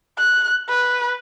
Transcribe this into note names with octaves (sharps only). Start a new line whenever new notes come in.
F#6
B4